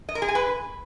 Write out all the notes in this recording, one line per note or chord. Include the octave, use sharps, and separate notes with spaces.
D#5
A#4
G#4
G#5
B4